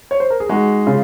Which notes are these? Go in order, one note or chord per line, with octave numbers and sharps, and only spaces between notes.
C#5
C5
A#4
G#4
G#3 D#4 F#4
C#3 F4 G#4